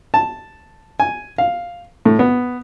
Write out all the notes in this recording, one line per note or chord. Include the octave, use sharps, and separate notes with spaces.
A5
G#5
F5
A2
B3